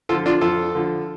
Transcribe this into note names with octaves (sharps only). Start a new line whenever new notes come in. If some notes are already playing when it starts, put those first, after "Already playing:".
D3 F3 F4 A4
D4 F4
F2 F4 A4
D3 F3